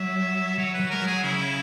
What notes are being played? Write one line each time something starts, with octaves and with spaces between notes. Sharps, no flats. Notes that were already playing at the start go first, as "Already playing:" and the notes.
Already playing: F#3 E5
F#3 C#5
B4
F#3
G#3 A#4
F#3
G#4
C#3 E4